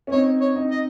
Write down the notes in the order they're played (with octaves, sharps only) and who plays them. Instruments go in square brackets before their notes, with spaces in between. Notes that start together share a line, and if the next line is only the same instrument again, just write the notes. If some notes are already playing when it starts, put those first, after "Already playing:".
[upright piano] C#4
[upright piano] C4 D#4 [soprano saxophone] C#5
[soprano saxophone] C#5
[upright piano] C4 D#4
[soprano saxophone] D#5